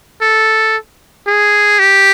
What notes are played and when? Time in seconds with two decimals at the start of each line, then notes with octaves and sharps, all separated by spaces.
0.22 A4
1.27 G#4
1.79 G4